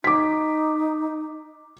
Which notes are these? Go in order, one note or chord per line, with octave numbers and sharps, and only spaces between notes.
D#4 D6 B6